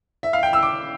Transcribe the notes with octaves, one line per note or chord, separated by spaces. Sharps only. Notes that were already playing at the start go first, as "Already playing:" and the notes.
E5
F5
G5
E6
D6